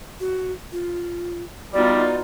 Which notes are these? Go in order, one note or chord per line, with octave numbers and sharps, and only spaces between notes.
F#4
F4
G3 B3 D#4 F4 F#4 D5